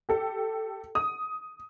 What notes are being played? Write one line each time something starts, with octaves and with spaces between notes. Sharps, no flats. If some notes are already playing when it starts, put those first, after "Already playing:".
G4 A4
D#6